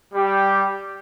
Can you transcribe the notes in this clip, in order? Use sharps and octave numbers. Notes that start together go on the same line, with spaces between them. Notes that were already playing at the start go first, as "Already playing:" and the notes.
G3 G4